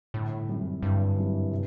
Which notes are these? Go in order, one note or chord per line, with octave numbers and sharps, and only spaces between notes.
G1 A2
F#2 E3 G3 C4
G1 G2
F#2 E3 G3 C4
C3